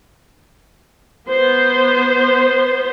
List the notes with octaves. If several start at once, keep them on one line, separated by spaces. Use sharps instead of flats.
B3 C5